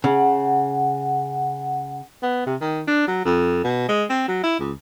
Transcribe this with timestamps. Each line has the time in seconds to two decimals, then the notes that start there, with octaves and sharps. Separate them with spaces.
0.04 C#3 F#5
2.23 B3
2.46 C3
2.61 D#3
2.88 D4
3.08 F#3
3.25 F2
3.64 B2
3.89 G#3
4.10 C4
4.28 F#3
4.43 E4
4.60 C#2